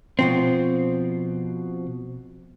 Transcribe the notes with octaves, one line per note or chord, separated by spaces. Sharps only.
B2 F3 C4